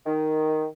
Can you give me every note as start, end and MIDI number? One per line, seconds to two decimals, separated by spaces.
0.06 0.66 51